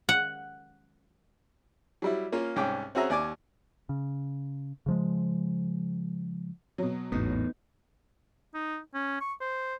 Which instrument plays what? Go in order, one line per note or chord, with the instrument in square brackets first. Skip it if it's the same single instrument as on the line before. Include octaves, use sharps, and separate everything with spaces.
[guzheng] F#5
[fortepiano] F#3 G3 E4
A#3 C#4 F4
C2 G#2 C#4 G5 D6
C4 C#4 F#4 G#4 E5 A#5
D#2 D5 G#5 D6
[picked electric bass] C#3
C#3 F3 G#3
[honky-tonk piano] B2 F#3
[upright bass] G#1 A3 [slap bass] E2 A2 [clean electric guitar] B3 D#4
[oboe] D#4
C#4
C#6
C5